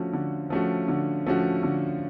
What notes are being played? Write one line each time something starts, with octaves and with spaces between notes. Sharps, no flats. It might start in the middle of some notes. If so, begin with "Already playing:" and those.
Already playing: D3 F3 A3 C#4 F#4
D3
F3 A3 C#4 F#4
D3
F3 A3 C#4 F#4
D3